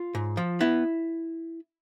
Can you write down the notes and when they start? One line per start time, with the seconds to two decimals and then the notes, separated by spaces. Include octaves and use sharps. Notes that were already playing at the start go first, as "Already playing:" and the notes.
Already playing: F4
0.15 G#2
0.37 F3
0.60 B3 E4